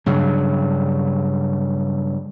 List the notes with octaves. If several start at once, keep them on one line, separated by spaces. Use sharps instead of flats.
G2 C#3 F#3